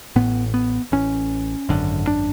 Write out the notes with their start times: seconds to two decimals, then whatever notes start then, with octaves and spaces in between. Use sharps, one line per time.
0.16 A1 A2 B3
0.54 B3
0.92 A1 A2 C#4
1.69 G#1 F#2 D3
2.07 D4